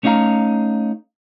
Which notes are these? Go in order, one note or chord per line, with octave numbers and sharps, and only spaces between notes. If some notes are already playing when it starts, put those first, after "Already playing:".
A3 C#4 D#4 F#4 F5 A#5